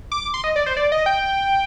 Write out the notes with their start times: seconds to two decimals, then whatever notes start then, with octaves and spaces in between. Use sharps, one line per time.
0.12 D6
0.34 C6
0.44 D#5
0.56 D5
0.66 C5
0.77 D5
0.92 D#5
1.06 G5